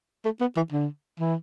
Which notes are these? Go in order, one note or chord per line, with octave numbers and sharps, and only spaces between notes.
A3
B3
E3
D3
E3